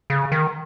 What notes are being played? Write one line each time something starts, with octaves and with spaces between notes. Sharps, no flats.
C#3
D#3